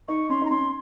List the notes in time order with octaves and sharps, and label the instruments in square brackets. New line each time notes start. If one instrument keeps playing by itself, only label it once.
[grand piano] D#4 [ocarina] C#6
[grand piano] C#4 [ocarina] C6
[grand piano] D#4 [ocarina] A#5
[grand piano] C#4 [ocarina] C6